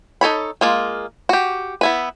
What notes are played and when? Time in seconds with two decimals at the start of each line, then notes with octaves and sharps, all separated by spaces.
0.21 D#4 A4 C#5 B5
0.61 G#3 A#3 F4
1.29 F#4 G4
1.81 B3 E4 B4